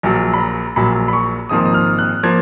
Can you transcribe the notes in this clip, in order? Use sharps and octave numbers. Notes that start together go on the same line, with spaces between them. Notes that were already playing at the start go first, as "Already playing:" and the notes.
A#1 A#2 F#3
B5
A#5
A#1 A#2 F#3 B5
B5
C#6
G#1 G#2 F3 A#3 D#6
D#6
F6
F#6
F3 A#3 G#6